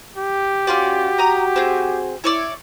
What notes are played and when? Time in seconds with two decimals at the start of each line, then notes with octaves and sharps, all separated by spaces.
0.17 G4
0.67 C#4 F4 F#4 D5
1.18 A#5 D#6
1.56 C4 G#4
2.24 E4 C#5 D5